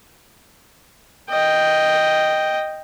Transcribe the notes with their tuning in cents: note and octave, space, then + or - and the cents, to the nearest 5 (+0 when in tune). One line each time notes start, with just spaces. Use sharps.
D#5 +0 G5 +0